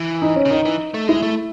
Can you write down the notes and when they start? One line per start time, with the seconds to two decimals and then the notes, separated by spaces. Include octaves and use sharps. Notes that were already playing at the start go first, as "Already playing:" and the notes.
Already playing: E3
0.22 D#4
0.36 C#4
0.45 C#3
0.50 D#3 D#4
0.65 E3
0.94 A3
1.08 G#3 E4
1.23 A3